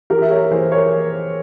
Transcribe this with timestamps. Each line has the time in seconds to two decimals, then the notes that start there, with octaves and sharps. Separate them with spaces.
0.10 E3 G4 A#4
0.22 E5
0.30 A#4 C#5
0.51 E3 G#4 C5
0.72 A#4 C#5